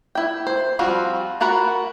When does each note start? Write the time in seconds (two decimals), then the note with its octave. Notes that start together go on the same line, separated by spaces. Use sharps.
0.15 E4 G5
0.47 C5
0.79 F3 G3 C4 F4 F#4
1.40 F4 F#4 A#4 F#5 B5